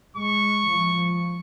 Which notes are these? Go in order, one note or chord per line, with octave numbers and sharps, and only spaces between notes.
G#3 C#6
F3